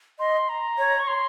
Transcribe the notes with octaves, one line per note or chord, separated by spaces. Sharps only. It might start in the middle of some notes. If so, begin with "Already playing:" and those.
D#5 C6
A#5
C#5
C#6
C6